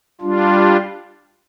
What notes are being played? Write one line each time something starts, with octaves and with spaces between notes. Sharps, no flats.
G3 D4 F4